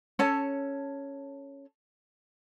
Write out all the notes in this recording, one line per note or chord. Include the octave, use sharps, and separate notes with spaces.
C#4 A4 C#5 A5